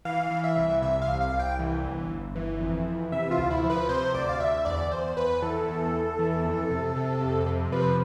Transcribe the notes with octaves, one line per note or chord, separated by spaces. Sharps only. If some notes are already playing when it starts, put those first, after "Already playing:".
E3 F5
E3
E5
C2
C3 E5
F5
C2
F5
C2
G5
E3
G1
G1
E3
F2
E3
C3 E5
F4
D2
E4
F3
B4
C3 C5
D2 D5
F5
D2 E5
E2 D5
E2 C5
E2 B4
E3 A4
E2
E2
E3
F2
C3
C3
F2
C3
F3 B4